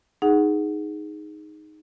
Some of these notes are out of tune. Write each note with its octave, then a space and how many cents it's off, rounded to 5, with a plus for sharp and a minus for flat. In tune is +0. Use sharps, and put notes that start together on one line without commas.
D#4 +0 G#4 +0 F#5 +0